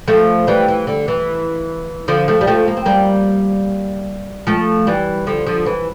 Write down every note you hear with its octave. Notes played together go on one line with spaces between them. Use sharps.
F3 A3
E3 G3
E3
D3
E3
D3 F3
F3 A3
G3
F3 A3
A#3
C4
G3 A#3
F3 A3
E3 G3
D3 F3
D3 F3
E3